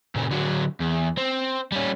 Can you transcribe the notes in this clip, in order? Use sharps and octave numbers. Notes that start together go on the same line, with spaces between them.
A#2 C#3
D3 F#3
E2
C4
G3 C#4